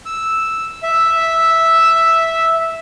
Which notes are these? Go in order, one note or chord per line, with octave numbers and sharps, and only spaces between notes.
E6
E5